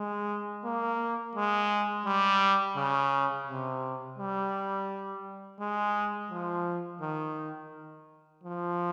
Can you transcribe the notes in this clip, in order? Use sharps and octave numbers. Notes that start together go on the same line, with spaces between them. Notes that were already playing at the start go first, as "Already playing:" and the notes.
Already playing: G#3
A#3
G#3
G3
C#3
C3
G3
G#3
F3
D#3
F3